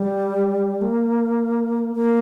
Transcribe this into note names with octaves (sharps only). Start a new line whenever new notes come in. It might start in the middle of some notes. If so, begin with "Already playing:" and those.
Already playing: G3
A#3
A#3